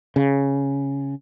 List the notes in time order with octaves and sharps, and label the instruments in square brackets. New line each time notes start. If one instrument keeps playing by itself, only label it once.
[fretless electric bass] C#3